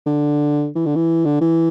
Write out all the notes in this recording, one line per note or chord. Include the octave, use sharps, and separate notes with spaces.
D3
E3
D3
E3
D3
E3